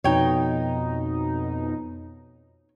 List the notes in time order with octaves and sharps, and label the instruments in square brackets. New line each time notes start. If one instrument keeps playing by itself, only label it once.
[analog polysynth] F2 B2 D#4 [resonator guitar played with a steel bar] C#5 G5